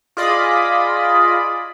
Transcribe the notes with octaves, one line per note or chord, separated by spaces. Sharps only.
F4 G#4 D5 D#5 B5